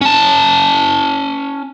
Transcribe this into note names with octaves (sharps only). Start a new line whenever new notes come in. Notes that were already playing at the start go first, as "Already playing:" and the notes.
C#4 A5